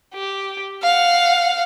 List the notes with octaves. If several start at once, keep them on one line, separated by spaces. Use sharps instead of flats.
G4
F5 F#5